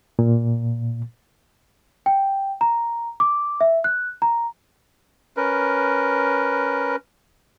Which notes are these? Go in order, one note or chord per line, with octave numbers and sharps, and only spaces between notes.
A#2
G5
A#5
D6
E5
F#6
A#5
C#4 A#4 B4